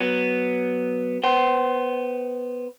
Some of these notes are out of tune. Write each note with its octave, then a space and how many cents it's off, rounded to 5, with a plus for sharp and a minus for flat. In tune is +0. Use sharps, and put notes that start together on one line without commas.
F#3 +5 B3 +0
B3 +0 C5 +0 F#5 +45